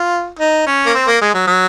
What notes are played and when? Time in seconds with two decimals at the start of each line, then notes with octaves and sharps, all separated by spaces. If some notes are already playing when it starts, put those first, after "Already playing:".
Already playing: F4
0.39 D#4
0.67 C#4
0.86 A#3
0.94 C4
1.07 A#3
1.21 G#3
1.34 F#3
1.47 F#3